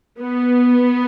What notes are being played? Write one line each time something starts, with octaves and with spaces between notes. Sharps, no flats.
B3